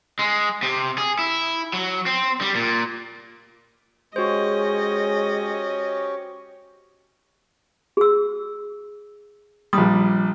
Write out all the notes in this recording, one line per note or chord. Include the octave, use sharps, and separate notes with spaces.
G#3
C3
G#4
E4
F#3
C4
G3
A#2
G#3 C#4 F#4 G4 C5 C#5 D#5
G#4 E6
A#1 G3 D#6